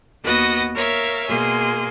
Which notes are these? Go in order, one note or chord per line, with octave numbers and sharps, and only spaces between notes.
D#2 B3 F#4 B4 D#5 A#6
A#4 C#5 E5 F5
B2 A#3 G#4 C6